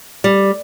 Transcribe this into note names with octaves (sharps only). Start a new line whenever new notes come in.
G3